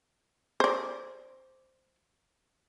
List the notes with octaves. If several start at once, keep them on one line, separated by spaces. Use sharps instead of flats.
C5 D5